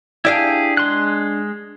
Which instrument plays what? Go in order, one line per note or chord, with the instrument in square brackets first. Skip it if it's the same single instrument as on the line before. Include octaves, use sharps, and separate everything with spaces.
[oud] D4 D#5 F5 [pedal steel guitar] E4 G4 G#4
[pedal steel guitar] G#3 C6 F#6